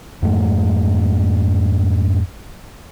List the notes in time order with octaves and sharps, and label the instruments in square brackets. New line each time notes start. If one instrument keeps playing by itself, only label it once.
[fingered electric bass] F2 G#2 A3 B3